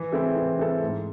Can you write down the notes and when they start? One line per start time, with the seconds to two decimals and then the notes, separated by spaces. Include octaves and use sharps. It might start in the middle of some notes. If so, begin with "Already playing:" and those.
Already playing: E3
0.12 G#3 C4 E4 A4
0.35 E3
0.59 G#3 C4 E4 A4
0.83 G#2